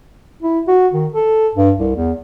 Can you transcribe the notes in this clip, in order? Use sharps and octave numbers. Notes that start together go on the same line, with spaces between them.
E4
F#4
D#3
A4
G2
C2
E2